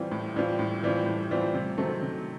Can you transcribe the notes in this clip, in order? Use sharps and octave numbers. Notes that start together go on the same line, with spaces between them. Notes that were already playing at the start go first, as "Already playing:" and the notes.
Already playing: A2 E3 G3 C4 F4
A2
E3 G3 C4 F4
A2
E3 G3 C4 F4
A2
E3 G3 C4 F4
C3
D#3 F#3 A3 C4
C3